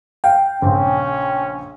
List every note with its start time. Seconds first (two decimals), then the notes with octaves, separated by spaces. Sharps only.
0.24 F5 G5
0.62 A#1 C#3 C4 C#4